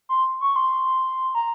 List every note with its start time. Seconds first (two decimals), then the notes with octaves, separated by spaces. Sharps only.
0.09 C6
0.41 C#6
0.56 C6
1.35 A#5